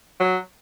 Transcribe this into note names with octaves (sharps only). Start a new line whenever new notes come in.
F#3